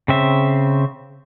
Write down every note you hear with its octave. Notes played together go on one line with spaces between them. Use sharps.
C#3 C4 E5